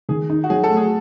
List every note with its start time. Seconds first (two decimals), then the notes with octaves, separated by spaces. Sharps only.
0.09 D#3 G#4
0.30 D#4
0.44 F#4
0.50 F#3 G#4
0.64 A4
0.70 A3
0.77 G#4